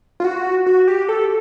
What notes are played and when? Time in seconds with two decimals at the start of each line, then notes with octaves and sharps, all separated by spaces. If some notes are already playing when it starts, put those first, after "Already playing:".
0.20 F4
0.24 F#4
0.66 F#4
0.88 G4
1.09 A4